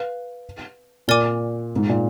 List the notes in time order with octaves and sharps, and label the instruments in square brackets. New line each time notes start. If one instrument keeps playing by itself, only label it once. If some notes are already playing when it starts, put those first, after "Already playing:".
Already playing: [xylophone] B4 F5
[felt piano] A#2 [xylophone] A#4 D5 G#5 D6
[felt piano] G#2
A#2